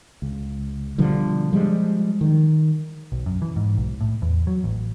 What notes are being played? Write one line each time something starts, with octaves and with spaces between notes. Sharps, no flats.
C#2
B2 D3 F3 G3
F3 G3 G#3
D#3
B1
F#2
E3
G#2
B1
A2
E2
F#3
A1